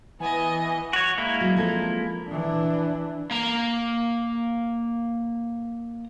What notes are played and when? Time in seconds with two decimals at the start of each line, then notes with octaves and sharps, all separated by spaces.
0.20 E3 B3 D#5 G#5
0.93 F#4 C#5
1.18 G#3 A#3 E4
1.41 F#3
1.57 F3 C4 A4
2.29 E3 D4
3.31 A#3 A#5